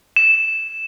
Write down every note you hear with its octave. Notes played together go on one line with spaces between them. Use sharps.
E7